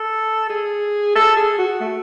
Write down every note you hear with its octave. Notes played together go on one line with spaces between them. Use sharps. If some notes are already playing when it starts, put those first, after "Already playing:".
Already playing: A4
G#4
A4
G#4
F#4
A3